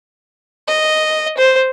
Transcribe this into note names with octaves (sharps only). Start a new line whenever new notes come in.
D#5
C5